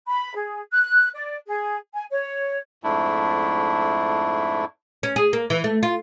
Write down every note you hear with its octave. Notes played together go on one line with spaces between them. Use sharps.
B5
G#4
F#6
D5
G#4
G#5
C#5
F2 G#2 A3 D4 E4
C#4
G#4
A#3
E3
A3
F4